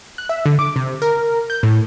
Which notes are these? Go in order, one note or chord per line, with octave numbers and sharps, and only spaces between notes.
F#6
E5
D3
D6
C3
A#4
G6
A2